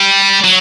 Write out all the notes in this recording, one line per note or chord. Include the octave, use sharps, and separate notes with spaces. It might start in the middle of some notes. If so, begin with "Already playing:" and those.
Already playing: G3
F#3